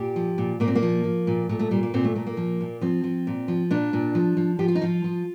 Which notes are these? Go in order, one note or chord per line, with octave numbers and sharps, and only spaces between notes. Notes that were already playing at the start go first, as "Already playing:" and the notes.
Already playing: A#2 G4
F3
A#2
A#2 A#3
C4
A#3
F3
F3
A#2
A#2 A3
A3
A#2 G3
A#3
A#2 C4
A3
A#2 A3
A#3
F3
A#2
F3 C4
F3
A#2
F3
A#2 D4
A#2
F3
F3
F3 G4
F4
D#4
F3 F4
F3